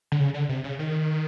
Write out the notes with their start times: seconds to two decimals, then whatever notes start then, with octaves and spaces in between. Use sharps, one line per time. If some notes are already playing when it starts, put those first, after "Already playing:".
0.12 D3
0.19 C#3
0.34 D3
0.49 C3
0.64 C#3
0.79 D#3